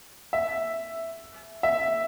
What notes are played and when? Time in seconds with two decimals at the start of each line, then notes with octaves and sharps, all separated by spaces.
0.33 E5
1.63 E5